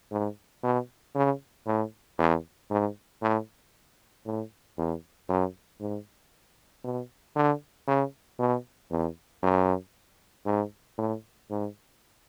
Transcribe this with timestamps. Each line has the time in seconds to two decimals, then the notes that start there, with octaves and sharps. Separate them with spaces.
0.12 G#2
0.63 B2
1.15 C#3
1.67 A2
2.19 E2
2.71 G#2
3.22 A2
4.25 A2
4.78 E2
5.29 F#2
5.81 G#2
6.84 B2
7.36 D3
7.88 C#3
8.39 B2
8.91 E2
9.43 F#2
10.46 G#2
10.98 A2
11.50 G#2